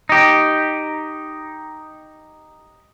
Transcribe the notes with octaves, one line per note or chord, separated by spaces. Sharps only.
D#4 G4